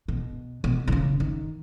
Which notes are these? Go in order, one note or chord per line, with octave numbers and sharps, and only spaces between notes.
B2
B2
D#3
C#3
D#3